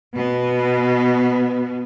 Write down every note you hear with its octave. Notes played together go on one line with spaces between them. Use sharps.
B2 B3